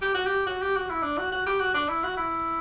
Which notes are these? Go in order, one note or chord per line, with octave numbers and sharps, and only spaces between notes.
G4
F#4
G4
F#4
G4
F#4
E4
D4
F#4
F#4
G4
F#4
D4
E4
F#4
E4